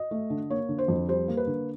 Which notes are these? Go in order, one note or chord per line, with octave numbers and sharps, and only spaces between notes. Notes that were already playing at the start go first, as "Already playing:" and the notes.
Already playing: D#5
A3
D3
A#3 C#5
D3
C5
F2
G3 C5
A#3
B4
D3